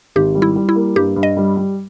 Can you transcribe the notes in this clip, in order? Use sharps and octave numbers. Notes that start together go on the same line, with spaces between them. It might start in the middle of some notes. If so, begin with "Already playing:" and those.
G#1 G4
G3
E4
G3
E4
A#3
G2 G4
G2
D#5
G3
G3